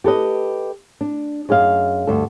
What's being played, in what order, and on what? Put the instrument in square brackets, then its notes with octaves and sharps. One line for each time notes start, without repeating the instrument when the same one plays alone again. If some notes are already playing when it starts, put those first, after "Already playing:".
[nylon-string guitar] G4 A4 B4 D#5
D4
F#2 G#4 D#5 F5
D2 G2 A4